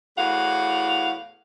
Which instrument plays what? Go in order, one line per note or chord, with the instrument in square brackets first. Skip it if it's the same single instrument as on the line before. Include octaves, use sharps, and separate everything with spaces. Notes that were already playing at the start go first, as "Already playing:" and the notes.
[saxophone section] E2 A2 F#4 F5 F#5